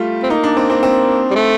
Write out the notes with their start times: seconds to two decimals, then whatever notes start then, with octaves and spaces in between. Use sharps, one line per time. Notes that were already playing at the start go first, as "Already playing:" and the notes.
Already playing: G3 A3 F4
0.23 C4
0.30 A#3 D#4
0.44 D4
0.57 C4
0.70 C4
0.83 C4
1.31 G3
1.36 A3